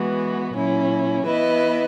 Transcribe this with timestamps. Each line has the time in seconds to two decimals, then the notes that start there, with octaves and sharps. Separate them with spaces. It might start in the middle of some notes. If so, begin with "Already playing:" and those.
Already playing: E3 G#3 B3 F#4
0.53 A#2 F#3 C#4 E4
1.24 E3 B3 E4 B4 D#5